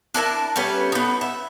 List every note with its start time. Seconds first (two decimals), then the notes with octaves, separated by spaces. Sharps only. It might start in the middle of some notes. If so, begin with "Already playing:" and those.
0.14 D4 E4 A#4 A5
0.56 G3 A3 B3 C#4
0.92 B3 D#4
1.21 E5